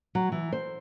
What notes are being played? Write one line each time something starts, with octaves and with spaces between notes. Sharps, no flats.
F#3
E3
C5